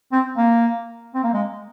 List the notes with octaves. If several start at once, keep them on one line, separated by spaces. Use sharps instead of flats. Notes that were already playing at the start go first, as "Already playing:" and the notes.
C4
A#3
C4
A#3
G#3